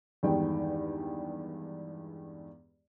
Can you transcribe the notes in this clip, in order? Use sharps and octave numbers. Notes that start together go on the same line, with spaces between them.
E2 G2 D#3 G#3 D4 G5